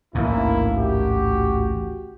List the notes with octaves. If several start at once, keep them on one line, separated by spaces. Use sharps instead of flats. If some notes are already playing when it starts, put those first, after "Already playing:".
A1 D2 G#2 A#3 E4
F#4 G4